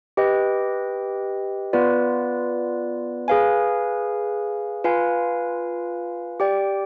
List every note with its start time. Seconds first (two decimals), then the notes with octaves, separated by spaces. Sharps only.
0.17 G4 B4 D#5 G5
1.73 B3 F4 B4 D5
3.28 G#4 B4 F5 G#5
4.84 F4 B4 F5 G#5
6.40 G4 D5 G5